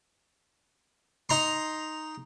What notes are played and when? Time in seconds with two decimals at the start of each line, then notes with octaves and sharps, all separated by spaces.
1.29 D#4 A#5 C6